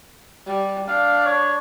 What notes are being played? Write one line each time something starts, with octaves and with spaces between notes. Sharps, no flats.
G3
D4 F5
C#5